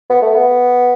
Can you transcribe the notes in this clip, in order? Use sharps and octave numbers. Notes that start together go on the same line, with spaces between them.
B3
A3
B3